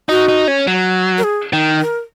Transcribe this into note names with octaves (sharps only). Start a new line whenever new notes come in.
D#4 F#4
D#4
C#4
F#3
A#4
G#4
D#3
A#4